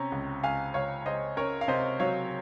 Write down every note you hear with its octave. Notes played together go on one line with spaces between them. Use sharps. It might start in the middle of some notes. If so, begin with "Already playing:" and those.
Already playing: C3 C#4 A#5
C#2
C#2 F5 G#5
C#2 C#5 F5
C#2 C5 D#5
C#4 A#4 C#5
F5
C3 C5 D#5
F#3 C#5 F5